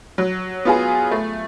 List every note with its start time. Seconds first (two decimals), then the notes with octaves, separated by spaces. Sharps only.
0.18 F#3
0.65 B3 F4 G#4
1.11 A3